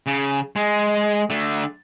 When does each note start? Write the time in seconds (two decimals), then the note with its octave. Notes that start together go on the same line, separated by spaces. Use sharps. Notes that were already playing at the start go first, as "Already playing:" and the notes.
0.06 C#3
0.56 G#3
1.30 D3 A3